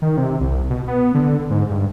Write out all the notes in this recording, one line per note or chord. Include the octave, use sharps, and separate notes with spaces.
D#3
C3
C2
B2
B3
D3
G#2
G2